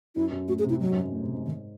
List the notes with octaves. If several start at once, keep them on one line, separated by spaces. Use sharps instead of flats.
F#2 E4
F#2
A2 F#4
G#4
C3
E4
G#2 F#3
F#2
A2
C3
G#2
D#3